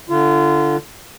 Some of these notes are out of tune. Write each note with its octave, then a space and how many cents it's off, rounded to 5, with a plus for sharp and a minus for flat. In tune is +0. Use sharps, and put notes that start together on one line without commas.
D3 +0 F4 -30